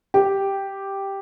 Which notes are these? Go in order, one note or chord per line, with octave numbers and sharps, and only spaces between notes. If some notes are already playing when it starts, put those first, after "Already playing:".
G4